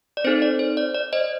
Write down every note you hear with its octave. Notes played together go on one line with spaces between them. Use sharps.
D5
C4 D#4 A4 C5
D5
C5
D5
D5
C5 D#5